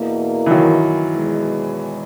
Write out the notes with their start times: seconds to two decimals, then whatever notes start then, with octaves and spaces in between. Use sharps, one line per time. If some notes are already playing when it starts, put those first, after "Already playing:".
Already playing: E2 B2 A#3 E4
0.46 E3
0.50 D#3 F#3
1.12 E2 B2 G#3